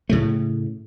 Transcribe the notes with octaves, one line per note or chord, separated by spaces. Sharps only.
A2 C#3 A3